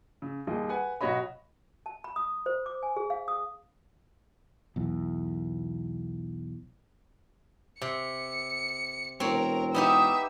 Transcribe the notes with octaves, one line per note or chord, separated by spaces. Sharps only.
C#3
D#2 G3 D#4 G#4 D#5
B4 F#5 G#5
B1 F#4 C#5 D#5 B5
A5
B5
D#6
C5
D6
G#5
G#4
F5
D#6
B1 E2
C3 C#7
E1 C4 A#4 C#5
B3 D#4 G4 E5 D#6 E6